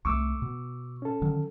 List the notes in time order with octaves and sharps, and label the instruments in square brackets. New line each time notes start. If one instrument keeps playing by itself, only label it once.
[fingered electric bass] C2 G#3 A3 [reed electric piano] C#6 D6 E6
[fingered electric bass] B2
[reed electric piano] C#4 A4
[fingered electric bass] D3 D#3 F#3